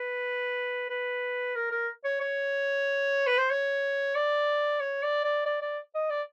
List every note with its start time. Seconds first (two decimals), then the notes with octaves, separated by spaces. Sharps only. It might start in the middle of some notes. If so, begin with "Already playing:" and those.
Already playing: B4
0.90 B4
1.55 A#4
1.71 A#4
2.04 C#5
2.21 C#5
3.27 B4
3.38 C5
3.50 C#5
4.15 D5
4.80 C#5
5.03 D5
5.24 D5
5.46 D5
5.62 D5
5.95 D#5
6.10 D5